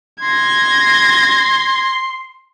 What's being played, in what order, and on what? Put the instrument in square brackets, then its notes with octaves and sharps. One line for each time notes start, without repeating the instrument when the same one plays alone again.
[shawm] C6 [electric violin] G#6 A#6